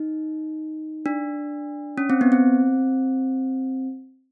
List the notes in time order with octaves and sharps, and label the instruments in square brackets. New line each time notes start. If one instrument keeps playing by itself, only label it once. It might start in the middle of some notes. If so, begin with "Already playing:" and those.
Already playing: [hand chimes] D#4
D4
C#4
C4
B3
C4